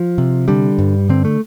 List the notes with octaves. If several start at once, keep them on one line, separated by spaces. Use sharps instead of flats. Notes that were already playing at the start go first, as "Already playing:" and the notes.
Already playing: F3
C3
D3 G3
G2
D3 C4
A3